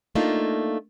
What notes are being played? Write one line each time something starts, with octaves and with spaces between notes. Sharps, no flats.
A3 A#3 D4 D#4 F4